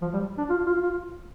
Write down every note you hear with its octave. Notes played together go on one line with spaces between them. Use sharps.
F3
G3
D4
F4
F4
F4